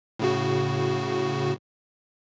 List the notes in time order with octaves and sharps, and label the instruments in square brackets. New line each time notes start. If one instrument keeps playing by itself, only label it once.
[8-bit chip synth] A2 C#3 F#4